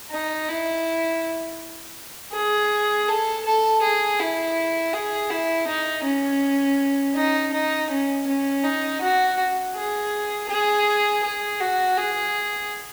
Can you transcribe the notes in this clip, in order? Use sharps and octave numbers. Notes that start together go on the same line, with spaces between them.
D#4
E4
G#4
A4
A4
G#4
E4
G#4
E4
D#4
C#4
D#4
D#4
C#4
C#4
D#4
F#4
G#4
G#4
G#4
F#4
G#4